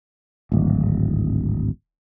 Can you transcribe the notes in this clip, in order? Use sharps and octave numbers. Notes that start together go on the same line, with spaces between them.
D1 G#1